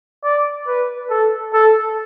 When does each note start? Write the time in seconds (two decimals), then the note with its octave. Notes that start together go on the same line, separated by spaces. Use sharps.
0.23 D5
0.67 B4
1.10 A4
1.53 A4